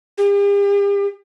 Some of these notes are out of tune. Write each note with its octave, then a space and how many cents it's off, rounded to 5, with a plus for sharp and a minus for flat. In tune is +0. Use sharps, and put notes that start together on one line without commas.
G4 +45